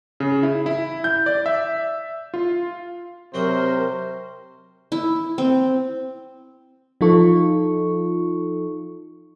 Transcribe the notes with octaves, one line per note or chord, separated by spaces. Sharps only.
C#3
E4
E4
G6
D5
E5
F4
C3 F#3 F#4 A#4 C5 D#5
E4
C4
F3 D#4 F4 A4 C#6